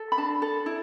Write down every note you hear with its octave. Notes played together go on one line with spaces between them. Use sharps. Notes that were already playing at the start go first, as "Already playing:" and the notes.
Already playing: A4
B5
D4 A5
A4
E4